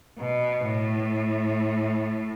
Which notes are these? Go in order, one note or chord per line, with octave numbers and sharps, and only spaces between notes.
B2
A2